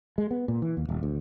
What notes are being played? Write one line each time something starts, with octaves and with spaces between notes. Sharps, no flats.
G#3
B3
A#2
E3
D#2
D#1
D2